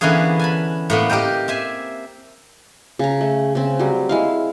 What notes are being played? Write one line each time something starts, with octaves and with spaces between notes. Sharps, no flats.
D3 E3 A#3 B3 C#4 G#4
G#5 A5 B5
A2 A#3 B3
G4 A#4 D#5 G5
C4 E5 G#5
C#3 A#5
A3
C#3 C4
F#3 G3
G#3 E4 F5